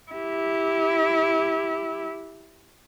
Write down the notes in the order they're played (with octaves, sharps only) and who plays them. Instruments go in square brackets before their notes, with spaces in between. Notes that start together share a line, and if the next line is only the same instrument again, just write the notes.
[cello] E4 G4